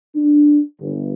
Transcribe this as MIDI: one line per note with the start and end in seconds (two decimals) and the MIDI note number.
0.16 0.59 62
0.80 1.13 31